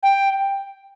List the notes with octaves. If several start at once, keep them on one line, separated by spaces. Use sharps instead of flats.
G5